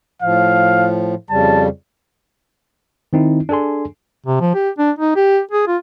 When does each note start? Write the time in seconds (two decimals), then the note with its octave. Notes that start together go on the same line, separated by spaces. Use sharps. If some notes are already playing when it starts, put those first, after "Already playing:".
0.22 A2 F3 F5
1.30 F2 C#3 G3 A5
3.13 D#3 C4 D#4 E4
3.49 D4 G#4 A4 G#5 C6
4.26 C3
4.41 F3
4.54 G4
4.79 D4
4.99 D#4
5.16 G4
5.52 G#4
5.67 F4